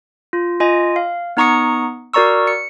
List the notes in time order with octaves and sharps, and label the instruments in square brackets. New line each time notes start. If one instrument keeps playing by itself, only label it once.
[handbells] F4
F4 D#5 G#5
F5
B3 D#4 A#5 C#6 D#6 C#7
F#4 A#4 D5 A#5 C#6 E6
C#7